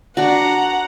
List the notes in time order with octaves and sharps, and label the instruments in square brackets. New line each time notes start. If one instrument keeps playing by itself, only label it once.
[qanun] D4 F#4 [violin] F#5 A#5